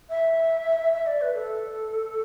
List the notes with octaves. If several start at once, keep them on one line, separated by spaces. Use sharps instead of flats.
E5
E5
D5
B4
A4